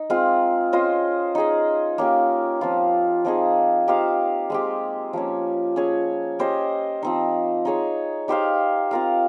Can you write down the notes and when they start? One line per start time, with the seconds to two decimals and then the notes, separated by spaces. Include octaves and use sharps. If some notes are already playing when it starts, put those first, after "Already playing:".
Already playing: D#4
0.10 G#3 C4 F4
0.73 C#4 F4 C5 D#5
1.35 D#4 G#4 D#5
1.98 A#3 C#4 G4
2.61 F3 C4 F4
3.25 F3 C4 D#4 G#4
3.88 D#4 G4 C5 F5
4.50 G#3 C4 G4
5.13 F3 A#3 C#4
5.76 C#4 G#4 C#5
6.39 C#4 G4 C5 D#5
7.03 F3 C4 D#4
7.65 D#4 G#4 C#5
8.28 D#4 G4 C5 F5
8.91 C4 F4 A#4 F5